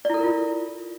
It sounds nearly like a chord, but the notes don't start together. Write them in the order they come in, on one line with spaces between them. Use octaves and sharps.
D5 E4 A4 A#4 F4